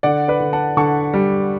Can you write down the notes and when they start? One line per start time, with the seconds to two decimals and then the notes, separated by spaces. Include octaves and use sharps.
0.03 D3 D5 F#5
0.28 B4 D5
0.40 D3
0.53 F#5 A5
0.77 D3 A5 C#6
1.14 G3